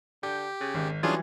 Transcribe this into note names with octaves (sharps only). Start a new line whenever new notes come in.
D3 G4 G6
C#3
G#1
E3 F#3 G3 C#4 D4 F4 G#4